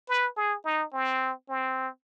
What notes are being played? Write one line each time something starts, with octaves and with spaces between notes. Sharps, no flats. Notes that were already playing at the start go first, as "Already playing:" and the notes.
B4
G#4
D#4
C4
C4